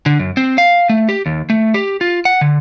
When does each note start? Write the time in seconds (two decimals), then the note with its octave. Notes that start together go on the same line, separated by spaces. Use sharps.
0.06 D3
0.19 F#2
0.37 C4
0.58 F5
0.90 A3
1.09 G4
1.26 D#2
1.50 A3
1.74 G4
2.01 F4
2.25 F#5
2.41 D3